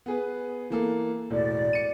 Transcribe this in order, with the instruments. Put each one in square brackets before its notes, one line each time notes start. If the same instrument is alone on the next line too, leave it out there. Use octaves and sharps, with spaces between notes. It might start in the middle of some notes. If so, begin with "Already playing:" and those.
[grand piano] B3 G#4 B4
E3 A#3 A4
[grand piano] E1 A2 [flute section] D5
[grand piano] C#7 D#7